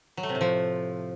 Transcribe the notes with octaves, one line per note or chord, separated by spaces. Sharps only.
F#3
A3
C3
A2
F3